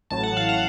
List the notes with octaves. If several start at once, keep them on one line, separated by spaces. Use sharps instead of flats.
A1 A2 F#3 A5
F#5
F5
F#5